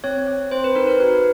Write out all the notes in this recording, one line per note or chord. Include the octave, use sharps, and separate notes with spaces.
C4 C#5
C4
C4 C5
B4
D#4 A#4
A#4
F#4 B4